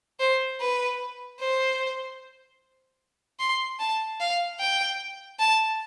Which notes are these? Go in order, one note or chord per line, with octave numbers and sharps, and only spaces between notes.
C5
B4
C5
C6
A5
F5
G5
A5